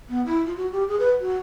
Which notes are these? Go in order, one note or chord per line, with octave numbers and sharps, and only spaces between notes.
B3
E4
F4
F#4
G4
G#4
B4
F#4